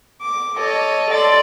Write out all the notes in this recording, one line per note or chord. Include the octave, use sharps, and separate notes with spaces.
D6
A4 C#5 D#5
A4 D5 C6